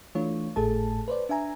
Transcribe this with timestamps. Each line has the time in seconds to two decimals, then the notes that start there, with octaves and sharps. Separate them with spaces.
0.15 E3 A3 D4 F4 C#5
0.56 G#1 A2 A3 G#4 A4 A5
1.08 B4 C5 D5
1.29 D4 E5 G#5 A#5